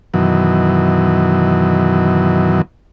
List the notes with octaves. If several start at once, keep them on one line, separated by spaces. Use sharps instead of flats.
F#2 B2 D#3 E3 F#3